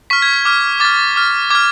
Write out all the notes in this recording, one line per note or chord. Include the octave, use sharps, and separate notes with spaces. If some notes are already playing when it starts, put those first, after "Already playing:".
C#6 F6 B6
G#6
G#6
D6 F6
D6 F6 A6
D6 F6
D6 F6 G#6